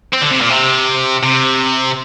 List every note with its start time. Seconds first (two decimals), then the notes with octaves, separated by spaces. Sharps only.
0.13 C4
0.22 D3
0.31 C3
0.41 A#2
0.49 C3
1.23 C3